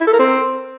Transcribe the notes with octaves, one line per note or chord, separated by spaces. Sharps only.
E4
A4
A#4
C4